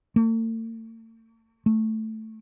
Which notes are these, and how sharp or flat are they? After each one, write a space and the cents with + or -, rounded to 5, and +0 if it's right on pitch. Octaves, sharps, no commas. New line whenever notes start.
A3 +45
A3 +0